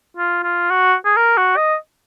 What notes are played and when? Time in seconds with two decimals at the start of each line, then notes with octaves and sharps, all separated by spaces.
0.17 F4
0.43 F4
0.71 F#4
1.05 G#4
1.17 A#4
1.37 F#4
1.57 D#5